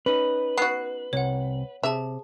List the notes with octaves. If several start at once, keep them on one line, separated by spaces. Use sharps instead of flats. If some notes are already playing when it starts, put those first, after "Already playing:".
C#4 D#4 B4
B3 F#4 F#6 C7
C2 C3 C#5 F#5
C3 G#4 E5 A5